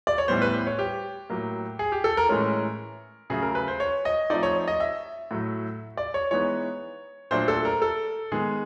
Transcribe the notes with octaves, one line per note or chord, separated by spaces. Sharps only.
D5
C#5
A2 E3 G3 B3 C5
B4
C5
C#5
G4
A2 F#3 A#3
G#4
G4
A4
A#4
A2 E3 G#3 C#4 A#4
C#3 F#3 A3 G#4
A#4
B4
C5
C#5
D#5
F3 A3 C4 D#4 D5
C#5
D#5
E5
A2 F#3 A3
D5
C#5
E3 G#3 B3 D#4 C#5
A#2 F#3 A3 D4 C5
A4
A#4
A4
D#3 G#3 B3 G#4